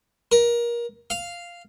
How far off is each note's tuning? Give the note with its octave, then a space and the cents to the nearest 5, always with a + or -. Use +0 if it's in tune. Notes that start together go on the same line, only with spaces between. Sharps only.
A#4 +25
F5 -5